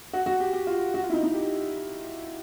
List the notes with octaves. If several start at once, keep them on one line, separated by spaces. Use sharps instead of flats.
F#4
F#4
G4
G4
F4
F#4
F4
E4
D#4
D#4
G4